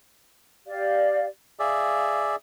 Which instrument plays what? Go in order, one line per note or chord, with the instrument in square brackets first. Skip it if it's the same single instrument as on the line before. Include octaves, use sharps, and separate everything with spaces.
[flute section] G4 D5 F5
[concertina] G#4 D5 E5 [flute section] F5